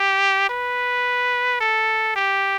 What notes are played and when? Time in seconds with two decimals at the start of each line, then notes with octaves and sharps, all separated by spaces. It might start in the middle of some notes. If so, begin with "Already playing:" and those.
Already playing: G4
0.50 B4
1.61 A4
2.16 G4